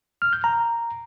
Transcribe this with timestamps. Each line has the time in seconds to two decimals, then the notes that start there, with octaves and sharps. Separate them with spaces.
0.22 F6
0.33 G6
0.44 A#5